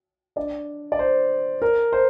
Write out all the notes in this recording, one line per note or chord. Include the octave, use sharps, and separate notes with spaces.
D4 D5
D5
C5
A#4
C5